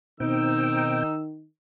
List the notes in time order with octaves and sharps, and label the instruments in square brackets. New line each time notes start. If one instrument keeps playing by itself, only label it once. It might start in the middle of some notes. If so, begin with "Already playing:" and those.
[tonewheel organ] B2 C4 G5 [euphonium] D#3 [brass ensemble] D#4 [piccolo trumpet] E6